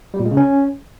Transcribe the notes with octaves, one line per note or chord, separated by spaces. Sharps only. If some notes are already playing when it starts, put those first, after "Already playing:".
G3
A#2
G#3
C#3
C#4